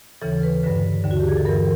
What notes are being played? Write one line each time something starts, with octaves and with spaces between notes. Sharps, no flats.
D#2 C#3 E3 A4
B4
G2 D3 B4
D#2 D3
F#4
G4
G#4
A4
G2 E3 A#4